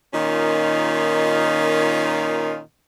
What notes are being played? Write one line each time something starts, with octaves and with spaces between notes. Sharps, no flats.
A#2 D#3 C#4 D#4 F4